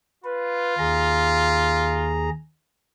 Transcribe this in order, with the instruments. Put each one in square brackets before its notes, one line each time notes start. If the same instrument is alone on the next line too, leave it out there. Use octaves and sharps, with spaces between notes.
[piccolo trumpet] F4 [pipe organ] B4
[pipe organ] D#2 G#4 A#5